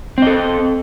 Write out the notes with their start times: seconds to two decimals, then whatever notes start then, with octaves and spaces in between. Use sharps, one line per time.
0.18 C4
0.22 D#5
0.27 A4